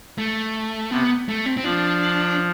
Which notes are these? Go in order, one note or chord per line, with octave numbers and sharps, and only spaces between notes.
A3
C3 B3
A3
C4
C4
F3 D4